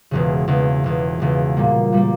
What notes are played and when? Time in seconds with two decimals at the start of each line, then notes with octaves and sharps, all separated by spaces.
0.11 E1 E2 C#3
0.48 E1 E2 C#3
0.84 E1 E2 C#3
1.20 E1 E2 C#3
1.57 A#2 G3 A#3
1.92 A#2 G3 A#3